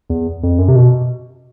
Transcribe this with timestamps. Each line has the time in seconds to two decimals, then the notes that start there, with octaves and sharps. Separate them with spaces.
0.10 E2
0.43 F2
0.59 F#2
0.68 C3
0.76 B2